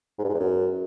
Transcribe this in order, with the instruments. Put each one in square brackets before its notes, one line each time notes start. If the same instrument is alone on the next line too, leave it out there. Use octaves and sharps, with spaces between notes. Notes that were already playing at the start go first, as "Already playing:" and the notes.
[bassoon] G#2
G2
G#2
E2
F#2